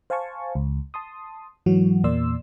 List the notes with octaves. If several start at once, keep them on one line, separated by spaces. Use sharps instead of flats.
C5 F5 G#5 A5 C#6
C#2
A5 C6 D#6
G#2 E3 F#3 F#4
E2 A#2 A#3 D5 C6 E6